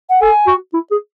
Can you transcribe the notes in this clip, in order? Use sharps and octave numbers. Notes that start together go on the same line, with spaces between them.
F#5
A4 G#5
F#4
E4
G#4